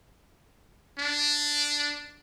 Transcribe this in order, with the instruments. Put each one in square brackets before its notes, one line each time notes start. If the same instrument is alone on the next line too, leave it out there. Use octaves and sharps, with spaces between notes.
[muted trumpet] D4